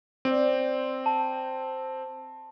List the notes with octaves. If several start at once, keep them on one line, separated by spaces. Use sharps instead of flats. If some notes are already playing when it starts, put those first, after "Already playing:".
C4 D5
A5